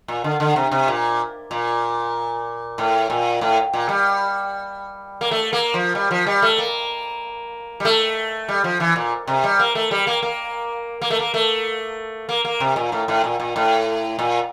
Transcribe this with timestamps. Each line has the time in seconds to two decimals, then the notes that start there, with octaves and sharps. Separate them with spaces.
0.08 A#2
0.24 D3
0.40 D3
0.56 C3
0.71 C3
0.88 A#2
1.51 A#2
2.78 A2
3.10 A#2
3.41 A2
3.73 A#2
3.89 G3
5.21 A#3
5.31 A3
5.53 A#3
5.74 F3
5.95 G3
6.11 F3
6.26 G3
6.42 A3
6.58 A#3
7.80 G3
7.85 A3
8.48 G3
8.64 F3
8.80 E3
8.96 A#2
9.27 C3
9.44 G3
9.59 A#3
9.75 A3
9.91 G3
10.07 A#3
10.22 A#3
11.02 A#3
11.10 A3
11.19 A#3
11.34 A3
12.29 A#3
12.45 A#3
12.60 C3
12.76 A#2
12.92 A2
13.08 A2
13.24 A#2
13.40 A#2
13.56 A2
14.19 A#2